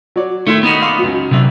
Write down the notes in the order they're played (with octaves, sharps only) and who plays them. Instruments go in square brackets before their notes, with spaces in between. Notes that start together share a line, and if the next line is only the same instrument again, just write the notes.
[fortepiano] F#3 C#5 D5
[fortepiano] D#3 E5 C6 [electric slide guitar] A3 E4
[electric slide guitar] B3 D#4 F#4
[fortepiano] F5 C6 D6
C#2 F#3
[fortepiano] C2 E5 [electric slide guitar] C3 F#3